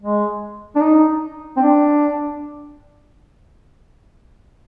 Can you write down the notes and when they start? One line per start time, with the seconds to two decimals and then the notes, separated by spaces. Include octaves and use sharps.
0.02 G#3
0.75 D4
0.81 D#4
1.57 C4
1.60 D4